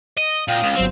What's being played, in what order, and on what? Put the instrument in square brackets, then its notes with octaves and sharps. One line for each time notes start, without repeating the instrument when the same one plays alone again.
[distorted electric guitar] D#5
[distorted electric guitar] A#2 [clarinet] F5 [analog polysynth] G5 D#6 A#6
[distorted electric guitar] C#2
[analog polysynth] G1 F#3 C5 [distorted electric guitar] C4